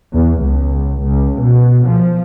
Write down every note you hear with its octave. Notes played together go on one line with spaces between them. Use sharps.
E2
C#2
C#2
B2
F3